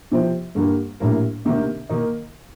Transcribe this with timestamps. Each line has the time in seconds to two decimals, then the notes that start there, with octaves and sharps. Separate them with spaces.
0.12 C3 F3 C4
0.55 G2 D3 G3 A#3
1.00 A#1 A2 G3 A#3
1.45 D2 C3 D#3 A#3
1.89 D#3 A#3 D#4